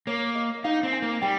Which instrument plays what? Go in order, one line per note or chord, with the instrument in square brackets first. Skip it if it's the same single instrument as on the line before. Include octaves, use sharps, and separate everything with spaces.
[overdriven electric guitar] A#3 [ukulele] C#5
[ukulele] D#5
[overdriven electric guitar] D#4 [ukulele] F5
[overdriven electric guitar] C4
[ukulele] G#5
[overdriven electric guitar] A#3
[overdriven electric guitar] G3 [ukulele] G5